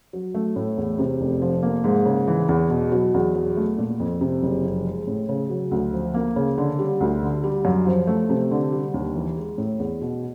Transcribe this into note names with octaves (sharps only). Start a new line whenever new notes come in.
F#3
A3
A2
E2
C3
F1
F3
A#3
G#2
C#3
E3
E2
B2
F#3
E2
F#3
A3
A#2
F2
C3
F#1
F3
G#3
A2
C#3
F#3
D2
F3
A#3
C#3
D3
G3
D2
D3
G3
F#2
F3
A3
C3
D3
G3
D#2
E3
G#3
A2
E2
B2